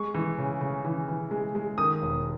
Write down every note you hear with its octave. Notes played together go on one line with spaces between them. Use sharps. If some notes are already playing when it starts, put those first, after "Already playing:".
Already playing: G#3 C#6
E3
C#3
C#3
E3
E3
G#3
G#3
D#3 D#6
E1